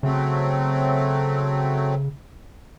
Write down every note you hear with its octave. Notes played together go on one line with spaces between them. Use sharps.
C#3 F#3 A3 C4